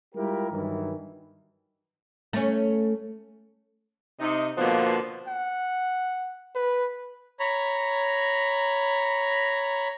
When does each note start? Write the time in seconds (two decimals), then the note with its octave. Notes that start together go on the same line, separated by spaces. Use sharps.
0.15 G3 G#3 E4 F4 G4 A#4
0.52 G2 D#3 E3 F#3
2.33 A3 C#4
4.20 C3 D#4
4.58 B2 D3 F3 A#3 B3
5.27 F#5
6.55 B4
7.40 C#5 A#5 B5